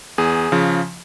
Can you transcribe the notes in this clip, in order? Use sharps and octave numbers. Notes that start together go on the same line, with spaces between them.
E2 G#4
C#3 F3